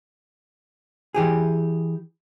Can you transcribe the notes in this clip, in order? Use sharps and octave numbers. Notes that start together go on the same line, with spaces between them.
E3 G4 G#4